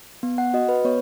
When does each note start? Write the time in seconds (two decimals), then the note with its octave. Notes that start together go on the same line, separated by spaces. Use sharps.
0.23 B3
0.38 F#5
0.54 F#4 D#5
0.69 B4
0.84 B3 C#5